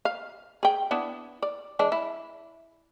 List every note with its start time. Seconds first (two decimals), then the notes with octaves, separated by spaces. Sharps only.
0.05 F5
0.63 G#4 G5
0.91 B3 D4 E4
1.42 D5
1.79 E3 G#3 D4
1.92 E4